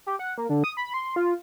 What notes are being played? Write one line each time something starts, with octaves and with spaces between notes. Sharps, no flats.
G4
F#5
A#3
D3
D#6
B5
C6
F4